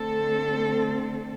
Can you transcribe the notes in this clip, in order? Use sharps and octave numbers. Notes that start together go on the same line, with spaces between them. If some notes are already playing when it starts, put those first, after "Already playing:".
Already playing: D3 A3 C4 A4